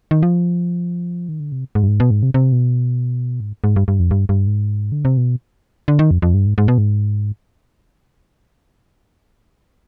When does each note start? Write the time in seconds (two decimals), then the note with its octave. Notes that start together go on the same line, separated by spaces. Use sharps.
0.11 D#3
0.23 F3
1.29 D#3
1.40 D3
1.52 C3
1.75 G#2
1.83 G2
1.88 G#2
2.00 B2
2.11 G#2
2.23 C3
2.34 C3
2.52 B2
3.40 G#2
3.64 G#2
3.76 G2
3.88 G2
4.00 F2
4.11 G2
4.29 G2
4.47 G#2
4.92 D3
5.05 C3
5.17 B2
5.88 D3
5.99 D#3
6.11 F2
6.22 F2
6.34 G2
6.47 G#2
6.58 G#2
6.68 B2
6.78 G#2